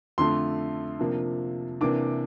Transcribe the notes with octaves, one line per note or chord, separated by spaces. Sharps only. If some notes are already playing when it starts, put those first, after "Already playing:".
F2 D3 A3 C6
C3 F3 A#3 D4
C3 E3 A#3 D4 D6